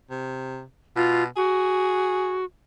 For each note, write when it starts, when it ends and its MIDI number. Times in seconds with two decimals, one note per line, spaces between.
0.10 0.63 48
0.96 1.26 47
0.96 1.23 65
1.36 2.45 66
1.36 2.39 68